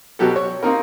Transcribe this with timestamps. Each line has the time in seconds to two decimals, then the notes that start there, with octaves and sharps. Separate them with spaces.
0.19 B2 F#3 G4 A4
0.36 C#5
0.63 A#3 C4 D#4 A#4